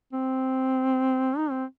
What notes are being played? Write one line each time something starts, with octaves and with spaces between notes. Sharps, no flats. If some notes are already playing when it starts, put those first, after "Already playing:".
C4
D#4
C4